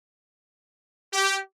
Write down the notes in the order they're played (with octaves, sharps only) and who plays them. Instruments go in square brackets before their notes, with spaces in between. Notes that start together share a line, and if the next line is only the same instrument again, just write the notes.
[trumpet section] G4